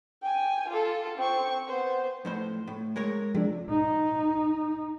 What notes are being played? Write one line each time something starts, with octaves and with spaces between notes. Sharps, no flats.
G5 G#5
F4 A4
C4 C#6
B3 C5
F2 A2 C5
A2
G#3 A#4 C#5
C3 F3 G#3 D4
D#4